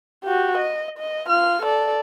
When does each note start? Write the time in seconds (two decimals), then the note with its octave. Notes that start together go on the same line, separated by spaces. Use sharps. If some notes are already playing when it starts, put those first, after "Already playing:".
0.24 F#4 G4
0.58 D#5
0.98 D#5
1.28 F4 F6
1.63 A4 D5